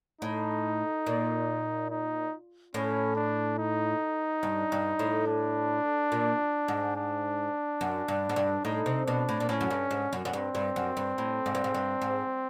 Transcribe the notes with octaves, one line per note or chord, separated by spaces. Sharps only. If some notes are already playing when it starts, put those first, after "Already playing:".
A2 D#4
A#2
D#4
A2 C#4
D4
D#4
G2
G2
A2
D4
A#2
G#2
D4
F#2
G2
G#2
G2
A2 D#4
C3
B2 D4
A2
A#2
A2 C#4
F#2
G2
G#2
F#2
F#2
G2 C4
G2
F#2
G2
A2
G#2
G2
G#2
G2
G#2